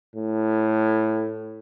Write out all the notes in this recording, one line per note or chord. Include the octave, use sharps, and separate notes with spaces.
A2